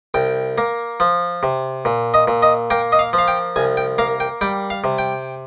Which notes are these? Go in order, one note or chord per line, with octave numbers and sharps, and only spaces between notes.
C2 G5
A#3
F3
C3
A#2
D#5
A#2
D#5
A#3 G5
D#5
F5
F3
F5
G5
C2 G#5
G5
A#3 F5
G5
G3 G5
F5
C3
G5